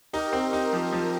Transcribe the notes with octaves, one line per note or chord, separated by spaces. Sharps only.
D#4 G4 A#4
C4
D#4 G4 A#4
F3
F3